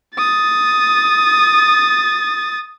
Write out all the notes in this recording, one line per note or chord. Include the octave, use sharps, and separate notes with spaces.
D#6 A6